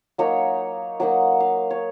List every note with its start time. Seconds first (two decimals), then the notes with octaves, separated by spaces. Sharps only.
0.18 F#3 A#3 D#4 C#5
1.00 F#3 A#3 D#4 F#5
1.40 F5
1.70 C#5